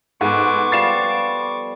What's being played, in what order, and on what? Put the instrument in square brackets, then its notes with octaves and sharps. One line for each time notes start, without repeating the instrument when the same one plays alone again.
[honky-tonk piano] G#2 [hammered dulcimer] B3 F#4 A4 [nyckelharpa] C#6 D6
[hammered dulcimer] F3 G3 F5 [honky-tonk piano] A6 C7 E7